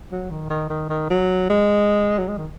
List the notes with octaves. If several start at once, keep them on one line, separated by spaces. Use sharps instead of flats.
F#3
D#3
D#3
D#3
D#3
F#3
G#3
F#3
G#3
D#3